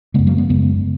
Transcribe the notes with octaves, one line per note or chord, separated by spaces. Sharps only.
F#2 C#3 G#3 B3
F#3 A#3
G#3 B3
F#2 C#3 G#3 B3